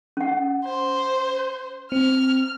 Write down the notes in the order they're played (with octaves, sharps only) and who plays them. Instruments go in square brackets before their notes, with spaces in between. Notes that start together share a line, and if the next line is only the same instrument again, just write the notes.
[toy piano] C#4 F#5
[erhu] C5
[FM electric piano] C4 [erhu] F6